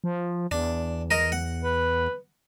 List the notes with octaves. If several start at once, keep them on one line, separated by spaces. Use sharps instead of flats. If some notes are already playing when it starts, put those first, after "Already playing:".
F3
E2 D4
A#4 D#5
F#5
B4